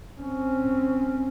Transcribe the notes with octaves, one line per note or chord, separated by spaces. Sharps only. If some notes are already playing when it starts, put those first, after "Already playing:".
C4 C#4